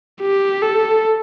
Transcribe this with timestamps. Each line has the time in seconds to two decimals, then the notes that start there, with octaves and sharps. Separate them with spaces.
0.21 G4
0.62 A4